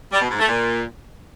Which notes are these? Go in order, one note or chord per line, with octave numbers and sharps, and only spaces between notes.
G3
B2
G#2
A3
A#2